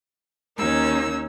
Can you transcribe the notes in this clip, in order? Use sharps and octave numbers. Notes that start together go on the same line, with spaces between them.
D#2 C#4 D#4 A#4 E6